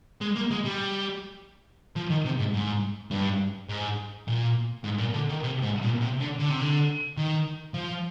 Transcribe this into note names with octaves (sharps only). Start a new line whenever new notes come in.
G#3
A#3
G#3
G3
F3
D#3
C3
G#2
G#2
G2
G#2
A#2
G#2
A#2
D3
D#3
C3
G#2
A#2
C3
D3
D3
C3
D3
D#3
F3